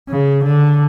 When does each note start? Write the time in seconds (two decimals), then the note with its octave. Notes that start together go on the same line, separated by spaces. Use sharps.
0.09 C#3
0.44 D3